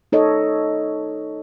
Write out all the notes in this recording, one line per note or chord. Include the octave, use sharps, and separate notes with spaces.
D#4 A4 C#5 D#5